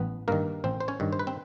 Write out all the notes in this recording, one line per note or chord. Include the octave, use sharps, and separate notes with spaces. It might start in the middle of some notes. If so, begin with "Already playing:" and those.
Already playing: A1 B3 B4
G2 D#3 A#3 A#4
A1 C4 C5
C5
C#4 C#5
G2 D#3
C5
B4
C4 C5